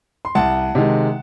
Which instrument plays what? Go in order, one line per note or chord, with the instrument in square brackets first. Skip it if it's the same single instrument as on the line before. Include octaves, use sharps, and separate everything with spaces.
[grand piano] C6
C2 F#5 A5
C3 D#3 G#3